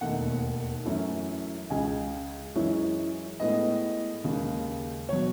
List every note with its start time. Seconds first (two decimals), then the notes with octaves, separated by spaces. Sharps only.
0.01 E1 D#2 D#3 A3 D#4 F#5
0.86 F#2 E3 A3 C#4 E4
1.70 C#2 C#3 G#3 G#5
2.55 F#2 E3 G#3 C#4 E4
3.40 A2 G#3 B3 D#5
4.24 D#2 C#3 G#3
5.09 B2 F#3 C#5